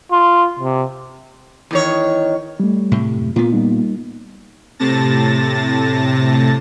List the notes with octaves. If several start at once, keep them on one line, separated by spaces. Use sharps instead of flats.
F4
C3
E2 D#3 C#5
G3 A3
A2 C3
F#2
A#2 A#3 B3 F4
G3 A#3 D#4
A2 C3 A5 A6 A#6